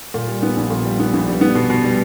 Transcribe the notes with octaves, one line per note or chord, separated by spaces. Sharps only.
A#2
G3
B3
A#1
A#2
G3
B3
A#1
G3
B3
B2
B2
G3